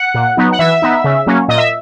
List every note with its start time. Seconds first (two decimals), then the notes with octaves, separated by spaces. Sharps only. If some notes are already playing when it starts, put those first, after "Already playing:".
Already playing: F#5
0.14 A#2
0.37 F#3 B3 D#4
0.52 F#5
0.59 E3 E5
0.82 B3 D#4
1.04 C#3
1.27 F#3 A#3 C#4
1.48 A#2 D#5
1.58 E5